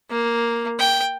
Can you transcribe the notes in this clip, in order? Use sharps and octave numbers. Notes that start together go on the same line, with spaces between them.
A#3
G5